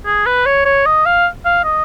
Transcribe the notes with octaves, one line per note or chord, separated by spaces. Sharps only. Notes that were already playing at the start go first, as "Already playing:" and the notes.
G#4
B4
C#5
C#5
D#5
F5
F5
D#5